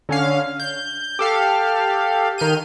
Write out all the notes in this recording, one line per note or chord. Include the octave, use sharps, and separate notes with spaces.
D3 C#4 F5
G6
G4 A4 F5
D#3 F6 G6 D#7